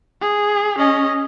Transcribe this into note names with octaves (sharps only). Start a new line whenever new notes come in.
G#4
C#4 D#5